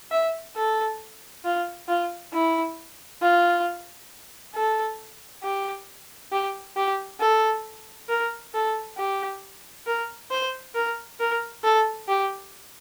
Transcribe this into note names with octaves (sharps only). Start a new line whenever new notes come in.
E5
A4
F4
F4
E4
F4
A4
G4
G4
G4
A4
A#4
A4
G4
A#4
C5
A#4
A#4
A4
G4